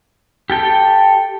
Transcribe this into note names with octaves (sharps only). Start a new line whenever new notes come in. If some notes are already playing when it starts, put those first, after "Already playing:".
G4 A4 G5